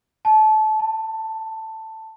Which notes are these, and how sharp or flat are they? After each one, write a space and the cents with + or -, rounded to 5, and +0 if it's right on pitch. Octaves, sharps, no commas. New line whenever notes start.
A5 -25
A5 +10